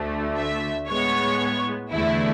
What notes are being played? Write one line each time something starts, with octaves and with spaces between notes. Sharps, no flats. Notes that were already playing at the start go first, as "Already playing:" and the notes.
Already playing: D2 D3 A3
E5
A2 G#3 B3 C#5
E2 D3 A3 E4